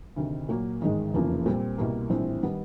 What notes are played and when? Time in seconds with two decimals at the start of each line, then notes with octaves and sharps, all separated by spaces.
0.16 D2 C3 D#3
0.49 A#2 F#3 A#3
0.81 A1 G#2 D#3 G#3
1.14 F1 E2 C#3 F3 A#3
1.46 A#2 G3 C4
1.78 C2 B2 G3 A#3
2.10 A#1 A2 E3 G3 C4
2.43 D#3 G3 B3